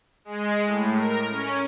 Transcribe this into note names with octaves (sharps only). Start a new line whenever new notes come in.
G#3
A2
A#4
C#4